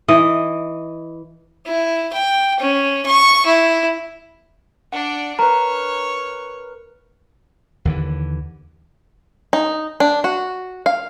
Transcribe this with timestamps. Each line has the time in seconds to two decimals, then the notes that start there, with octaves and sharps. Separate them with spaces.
0.08 E3 D#5
1.66 E4
2.13 G5
2.60 C#4
3.06 C#6
3.46 E4
4.93 D4 D5 F#5
5.39 A#4 B4 C#5 A#5
7.85 D#2 D3 E3
9.53 D#4
10.00 D4
10.24 F#4
10.86 F5